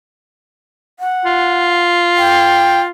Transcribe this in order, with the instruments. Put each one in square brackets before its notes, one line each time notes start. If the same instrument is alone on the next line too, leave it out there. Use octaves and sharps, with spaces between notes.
[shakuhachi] F#5
[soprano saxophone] F4
[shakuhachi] G5